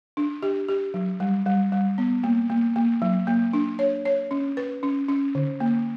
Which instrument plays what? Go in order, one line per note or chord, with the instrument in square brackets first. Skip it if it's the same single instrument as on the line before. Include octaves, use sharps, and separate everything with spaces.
[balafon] D4
G4
G4
F#3
G3
G3
G3
B3
A#3
A#3
A#3
F#3
A#3
D4
C#5
C#5
C#4
B4
C#4
C#4
D3
A#3